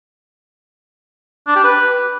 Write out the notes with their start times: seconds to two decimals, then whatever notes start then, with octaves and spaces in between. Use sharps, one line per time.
1.47 D4
1.56 G4
1.64 B4